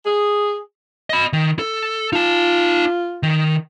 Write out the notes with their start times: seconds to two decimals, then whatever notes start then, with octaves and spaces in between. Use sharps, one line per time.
0.05 G#4
1.10 D#5 B5
1.33 D#3
1.59 A4
2.13 D#4 F4 A5
3.23 D#3